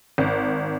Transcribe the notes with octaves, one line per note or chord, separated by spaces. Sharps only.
G#1